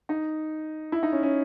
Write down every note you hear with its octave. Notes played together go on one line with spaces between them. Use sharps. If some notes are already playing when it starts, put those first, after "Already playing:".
D#4
E4
D#4
C#4
C#4